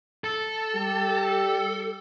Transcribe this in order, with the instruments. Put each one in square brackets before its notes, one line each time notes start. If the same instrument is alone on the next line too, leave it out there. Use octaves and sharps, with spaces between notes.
[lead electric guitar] A4
[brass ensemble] G3 G4